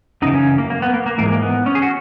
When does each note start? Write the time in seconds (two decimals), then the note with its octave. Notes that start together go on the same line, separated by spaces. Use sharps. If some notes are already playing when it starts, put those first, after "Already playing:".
0.22 F#2 C#3 E3 D#4
0.34 C#4
0.58 A#3
0.70 A#3
0.82 B3
0.94 A#3
1.06 A#3
1.18 G#2 E3 A#3
1.26 G#3
1.32 A#3
1.42 B3
1.66 C#4
1.75 G#4
1.82 F#4